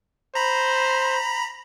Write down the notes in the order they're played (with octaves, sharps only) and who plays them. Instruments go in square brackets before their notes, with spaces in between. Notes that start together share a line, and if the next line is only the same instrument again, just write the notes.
[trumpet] C5 [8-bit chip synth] A#5 B5